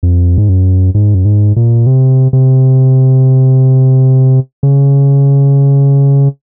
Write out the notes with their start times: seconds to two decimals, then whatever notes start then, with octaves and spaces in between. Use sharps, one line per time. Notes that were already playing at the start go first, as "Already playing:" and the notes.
0.03 F2
0.38 G#2
0.49 F#2
0.94 G#2
1.15 F#2
1.25 G#2
1.56 A#2
1.87 C3
2.33 C3
4.63 C#3